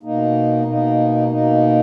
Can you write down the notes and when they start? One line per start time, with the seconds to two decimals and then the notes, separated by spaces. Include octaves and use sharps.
0.03 B2 A#3 D#4
0.65 B2 A#3 D#4
1.28 B2 A#3 D#4